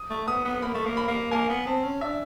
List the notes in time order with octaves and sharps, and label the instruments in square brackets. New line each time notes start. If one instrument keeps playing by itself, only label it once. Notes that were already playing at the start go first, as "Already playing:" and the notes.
Already playing: [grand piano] D#6
[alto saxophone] A3
[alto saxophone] B3 [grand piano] D#6
[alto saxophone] B3
[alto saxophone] A#3 [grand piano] B5
[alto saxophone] A3
A#3
[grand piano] B5
[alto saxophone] A#3
[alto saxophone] A#3 [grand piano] G#5
[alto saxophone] B3
[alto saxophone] C4 [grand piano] A5
[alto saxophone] C#4
[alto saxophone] D4 [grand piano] E5